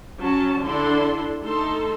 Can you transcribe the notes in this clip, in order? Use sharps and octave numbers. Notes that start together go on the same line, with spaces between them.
F#3 C#4 A5
D3 D4 E4 A4 C6
A3 D#4 A4 C6